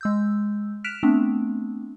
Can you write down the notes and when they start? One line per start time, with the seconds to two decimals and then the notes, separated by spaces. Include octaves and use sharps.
0.01 G#3 E6 G6
0.84 F6 F#6 B6 D7 E7 F7
1.03 A3 B3 C4 D4